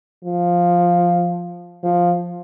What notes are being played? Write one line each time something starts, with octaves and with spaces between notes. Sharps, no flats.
F3
F3